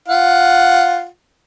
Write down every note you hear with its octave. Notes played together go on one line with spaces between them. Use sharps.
F4 F#5